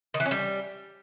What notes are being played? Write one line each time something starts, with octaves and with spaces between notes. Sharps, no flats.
D#3
E3
C#4
G3